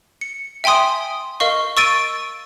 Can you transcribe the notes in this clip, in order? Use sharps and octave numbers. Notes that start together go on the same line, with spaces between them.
C#7
E5 G5 G#5 C6 D#6
A#4 D#5 F5 C#6
C#6 E6 A6 D7 D#7